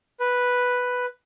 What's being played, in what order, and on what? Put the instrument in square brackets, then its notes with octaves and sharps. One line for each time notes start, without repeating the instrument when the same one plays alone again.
[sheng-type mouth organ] B4